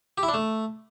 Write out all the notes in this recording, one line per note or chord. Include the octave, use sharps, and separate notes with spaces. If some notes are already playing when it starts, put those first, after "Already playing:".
G4
E4
D4
A3